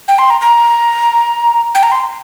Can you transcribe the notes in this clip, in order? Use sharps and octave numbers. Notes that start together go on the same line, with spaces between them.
G5
C6
A#5
A#5
G5
A#5
C6